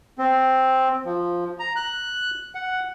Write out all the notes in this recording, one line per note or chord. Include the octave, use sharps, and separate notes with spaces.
C4
F3
A#5
F#6
F#5